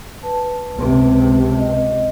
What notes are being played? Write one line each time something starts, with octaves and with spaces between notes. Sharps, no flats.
B4 A5
C#2 C3
D#5